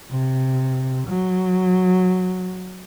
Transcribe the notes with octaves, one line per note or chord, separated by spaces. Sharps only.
C3
F#3